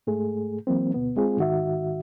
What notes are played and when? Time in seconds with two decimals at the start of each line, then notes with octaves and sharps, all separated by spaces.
0.07 G#2 A3 G#4
0.67 E3 F#3 A#3 C4
0.94 D2 B2 B3
1.17 G#3 C4 F4 G#4
1.37 G#2 D#3 F#4 E5